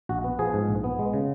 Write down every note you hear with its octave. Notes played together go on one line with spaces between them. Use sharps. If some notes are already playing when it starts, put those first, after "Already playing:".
A#1 F#4
B3
F3 G#4
G#2
A#1
B3
G#3
C#3